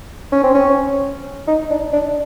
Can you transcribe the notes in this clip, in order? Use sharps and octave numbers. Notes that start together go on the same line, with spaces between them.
C#4
C4
C#4
D#4
D4
D4